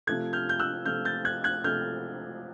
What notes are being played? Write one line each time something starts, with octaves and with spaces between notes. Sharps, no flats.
C3 F3 A3 F#6 G#6
F6 G6
G6
E6 F#6
C3 F3 A3 F6 G6
G6 A6
F#6 G#6
F#6 G#6
C3 F3 A3 F6 G6